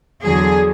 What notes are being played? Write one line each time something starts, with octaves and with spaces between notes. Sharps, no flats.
E2 D3 F#3 G#4